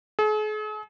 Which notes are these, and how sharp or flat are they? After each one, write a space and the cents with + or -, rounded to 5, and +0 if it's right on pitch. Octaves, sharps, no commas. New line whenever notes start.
G#4 +45